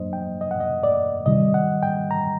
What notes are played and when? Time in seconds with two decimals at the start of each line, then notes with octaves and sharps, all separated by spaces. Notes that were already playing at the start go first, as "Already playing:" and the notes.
Already playing: F#2 F#3 A#3 D4 C5 D#5
0.13 G5
0.41 D#5
0.51 F#5
0.60 D#5
0.83 D5
1.26 C3 D#3 G3 D#5
1.54 F#5
1.83 G5
2.11 A#5